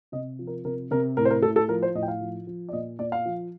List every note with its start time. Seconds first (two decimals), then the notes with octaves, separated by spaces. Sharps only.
0.12 C3 D#5
0.39 F3
0.47 A#4
0.65 C3 A#4
0.91 C3 A#4
1.17 A2 A#4
1.25 C5
1.30 A#4
1.42 A2 A4
1.56 A4
1.68 F3 A#4
1.82 C5
1.95 A2 D#5
2.03 G5
2.08 F5
2.21 F3
2.47 F3
2.69 D5
2.73 A#2 D#5
2.99 A#2 D5
3.12 F5
3.25 F3